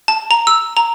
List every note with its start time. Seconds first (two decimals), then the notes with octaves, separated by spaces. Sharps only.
0.08 A5
0.31 A#5
0.47 E6
0.77 A#5